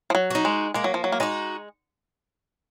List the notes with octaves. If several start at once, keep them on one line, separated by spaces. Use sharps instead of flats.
F3
F#3
D#4 F#4
G#3
G#3 A#3
F#3
F3
F#3
A#3
G#3 D#4 F#4